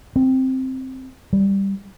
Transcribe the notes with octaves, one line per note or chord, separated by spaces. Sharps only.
C4
G3